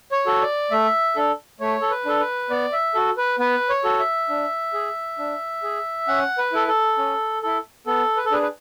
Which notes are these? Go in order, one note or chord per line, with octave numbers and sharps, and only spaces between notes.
C#5
F#4 A4
D5
A3 E5
D4 A4
A3 C#5
A4
B4
D4 A4
B4
B3 D5
E5
F#4 A4
B4
B3 B4
C#5
F#4 A4
E5
D4
G#4
D4
G#4
C#4 F#5
B4
E4 A4
A4
C#4
E4 A4
B3 A4
B4
A4
D4 G#4 B4
B4